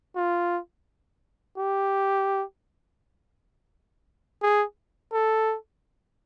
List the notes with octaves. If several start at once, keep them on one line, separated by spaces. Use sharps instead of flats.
F4
G4
G#4
A4